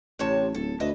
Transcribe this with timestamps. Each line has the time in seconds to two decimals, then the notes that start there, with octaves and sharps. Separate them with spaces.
0.19 A1 C3 C#5 A5
0.55 D1 A4
0.80 D2 B4 D#5 E5